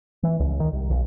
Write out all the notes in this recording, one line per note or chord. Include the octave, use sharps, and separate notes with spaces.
E3
C#2
D#3
C2
B1